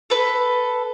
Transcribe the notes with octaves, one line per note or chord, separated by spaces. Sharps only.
A4 B4